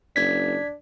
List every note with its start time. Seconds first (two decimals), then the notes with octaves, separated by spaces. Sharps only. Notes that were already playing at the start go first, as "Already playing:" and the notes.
0.16 F#1 D4 G#6 B6